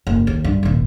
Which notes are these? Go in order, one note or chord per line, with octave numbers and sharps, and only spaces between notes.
F#1
D#2
G2
D#1 G#1